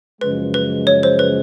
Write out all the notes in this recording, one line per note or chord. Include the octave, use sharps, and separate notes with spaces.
F#2 C#3 F3 G#3 B4
B4
C#5
C5
B4